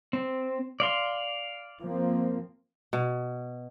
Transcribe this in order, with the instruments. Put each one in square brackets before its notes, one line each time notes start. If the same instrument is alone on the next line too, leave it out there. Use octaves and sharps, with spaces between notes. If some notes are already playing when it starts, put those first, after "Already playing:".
[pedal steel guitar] C4
D5 F5 C6
[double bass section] F3 A#3 C4
[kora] B2